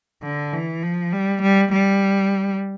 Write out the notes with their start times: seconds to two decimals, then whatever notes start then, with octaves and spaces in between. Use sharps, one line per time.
0.23 D3
0.53 E3
0.83 F3
1.13 G3
1.42 G3
1.72 G3